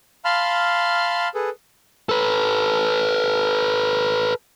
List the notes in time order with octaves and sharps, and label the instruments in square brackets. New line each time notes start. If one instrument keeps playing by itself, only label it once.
[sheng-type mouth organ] F5 A5 B5 C6 F6
G#4 A4 B4
[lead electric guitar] A4 B4